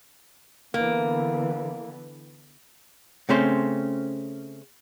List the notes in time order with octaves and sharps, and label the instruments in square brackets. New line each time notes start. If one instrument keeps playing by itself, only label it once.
[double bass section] D3 E3 B3 [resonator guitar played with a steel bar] A#3
[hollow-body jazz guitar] C#3 A3 C4 C#4 C5